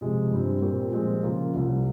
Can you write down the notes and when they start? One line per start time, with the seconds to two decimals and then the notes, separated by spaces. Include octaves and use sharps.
0.01 C3 F3 G#3
0.31 G2 G3 C4
0.61 A#2 G3 C4 G4 A#4
0.92 A#2 F3 G#3 C4
1.23 C#3 F3 A#3 F4 A#4
1.54 C2 C3 G3